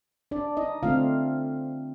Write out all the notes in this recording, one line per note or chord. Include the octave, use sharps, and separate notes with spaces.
D4 D5
D#4 D#5
D3 A3 C4 F4 F5